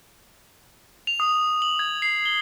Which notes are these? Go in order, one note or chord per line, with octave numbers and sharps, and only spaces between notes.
F7
D#6
F#7
G#6
C7
G7